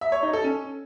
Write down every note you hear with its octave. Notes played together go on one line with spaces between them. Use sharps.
E5
C#5
D#4
A4
C#4